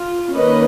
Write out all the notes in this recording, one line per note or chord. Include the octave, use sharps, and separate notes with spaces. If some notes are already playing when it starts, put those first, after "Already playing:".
Already playing: F4
D#3 A#3 C#4 B4 D#5